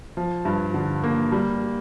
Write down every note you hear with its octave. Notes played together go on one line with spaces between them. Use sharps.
F3
G2
D3
A#3
G3